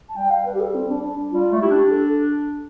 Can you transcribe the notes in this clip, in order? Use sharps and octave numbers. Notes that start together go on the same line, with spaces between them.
A5
G3 G5
F5
B4
G4
A4
C4
D4
D4
G3 F4
A3
E4 G4
D4
A4